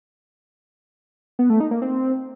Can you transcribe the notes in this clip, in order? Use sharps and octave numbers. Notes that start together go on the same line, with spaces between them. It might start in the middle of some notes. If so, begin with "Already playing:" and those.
B3
A3
D#4
A#3
C4